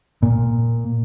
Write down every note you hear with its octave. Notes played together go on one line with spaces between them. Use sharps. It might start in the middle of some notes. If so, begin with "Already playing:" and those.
A#2